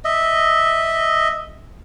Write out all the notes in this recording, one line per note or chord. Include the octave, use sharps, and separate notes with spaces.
D#5 E5